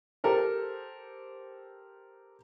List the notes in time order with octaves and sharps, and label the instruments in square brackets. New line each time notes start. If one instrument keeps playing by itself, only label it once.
[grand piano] G4 A4 A#4 C5